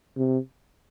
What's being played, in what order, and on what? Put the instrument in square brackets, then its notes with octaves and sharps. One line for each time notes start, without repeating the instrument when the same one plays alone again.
[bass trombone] C3